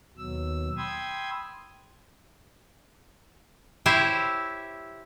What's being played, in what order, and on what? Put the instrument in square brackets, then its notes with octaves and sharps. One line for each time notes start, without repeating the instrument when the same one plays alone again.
[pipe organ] D#2 B2 F#3 E6
G5 B5 C6 D#6 E6 G#6
[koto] E4 G4 C5 C#5 E5